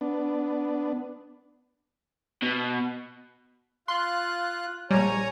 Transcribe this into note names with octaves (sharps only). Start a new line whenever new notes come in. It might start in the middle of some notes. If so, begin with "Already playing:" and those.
B3 D4
B2
F4 C6 F#6
A#1 G3 C#5 G#5 A#5